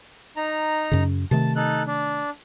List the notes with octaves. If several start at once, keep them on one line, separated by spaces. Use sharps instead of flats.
D#4 A#5
F#2 C#3
C3 D#3 A3 A5
D#4 A4 F#6
D4